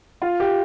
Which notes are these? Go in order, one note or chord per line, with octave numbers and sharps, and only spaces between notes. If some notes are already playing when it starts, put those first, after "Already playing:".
F4
G4